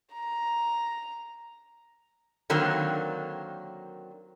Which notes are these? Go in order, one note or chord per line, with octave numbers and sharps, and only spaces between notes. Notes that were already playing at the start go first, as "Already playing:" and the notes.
A#5
D3 D#3 F#3 A#3 C4